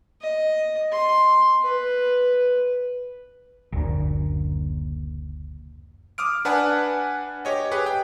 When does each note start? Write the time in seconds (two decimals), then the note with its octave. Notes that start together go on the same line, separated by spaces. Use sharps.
0.21 D#5
0.92 C6
1.63 B4
3.72 F#1 D2 A#2
6.18 D6 D#6 F6 D7
6.45 D4 B4 F#5 G#5 A5
7.45 G4 C#5 D#5
7.71 G4 G#4 B4
7.86 G5